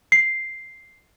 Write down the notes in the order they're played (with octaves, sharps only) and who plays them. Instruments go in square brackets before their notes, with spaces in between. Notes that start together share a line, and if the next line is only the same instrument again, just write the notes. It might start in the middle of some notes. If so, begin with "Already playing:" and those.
[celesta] C7